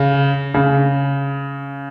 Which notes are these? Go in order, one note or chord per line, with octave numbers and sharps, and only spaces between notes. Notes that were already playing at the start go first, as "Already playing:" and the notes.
Already playing: C#3
C#3